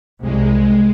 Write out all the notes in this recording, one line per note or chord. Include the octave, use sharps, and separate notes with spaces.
C2 G#3